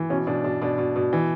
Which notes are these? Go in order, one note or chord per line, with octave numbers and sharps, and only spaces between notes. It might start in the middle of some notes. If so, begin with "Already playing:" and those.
Already playing: E3
B2 C#4
B2 D4
B2 D4
B2 D4
B2
B2
E3